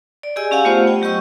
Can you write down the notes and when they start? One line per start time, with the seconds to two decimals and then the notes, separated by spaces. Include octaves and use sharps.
0.23 D5
0.36 G4 G#4 D5 D#5 G#5 E6
0.51 C#4 G4 F5 F#5 G#5
0.65 A3 B3 F4 G4 C5 F#5
0.87 D#5 G5
1.02 F#3 G4 D#5 C#6 E6